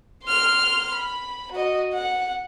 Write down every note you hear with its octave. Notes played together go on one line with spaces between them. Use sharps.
C6 F6
B5
F#4 D#5
F#5